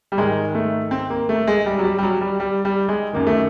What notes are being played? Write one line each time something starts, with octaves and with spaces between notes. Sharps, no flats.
G3
G#2 D#3 G#3
A3
C4
A#3
A3
G#3
G3
F#3
G3
G3
F#3
G3
G3
G3
G#3
F#2 D#3 A#3
A3